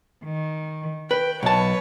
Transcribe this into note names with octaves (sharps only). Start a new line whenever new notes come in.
D#3
B4 G5
B1 B4 C#5 A5